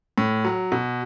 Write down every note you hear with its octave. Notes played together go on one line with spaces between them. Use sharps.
A2
F#3
B2